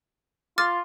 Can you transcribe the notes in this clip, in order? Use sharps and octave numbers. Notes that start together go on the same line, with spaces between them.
F4 D6 F6 A6